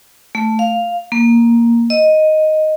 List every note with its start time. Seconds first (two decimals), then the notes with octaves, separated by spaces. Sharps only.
0.35 A3
0.59 F5
1.12 A#3
1.90 D#5